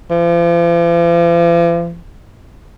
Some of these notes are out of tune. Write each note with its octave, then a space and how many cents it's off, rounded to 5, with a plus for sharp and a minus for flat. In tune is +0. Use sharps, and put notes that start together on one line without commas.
F3 -45